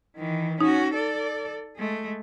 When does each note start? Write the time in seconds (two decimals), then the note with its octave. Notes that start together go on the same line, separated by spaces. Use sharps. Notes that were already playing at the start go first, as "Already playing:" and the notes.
0.17 D#3 E3
0.61 C#4 D#4 F#4
0.94 A4 D5
1.76 G#3 A3